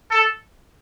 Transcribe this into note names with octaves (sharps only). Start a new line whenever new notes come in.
A4